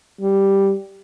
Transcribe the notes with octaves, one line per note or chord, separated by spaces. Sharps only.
G3